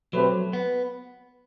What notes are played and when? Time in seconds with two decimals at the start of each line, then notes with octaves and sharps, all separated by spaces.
0.13 B2 F#3 A3 C4 G4 B4
0.53 B3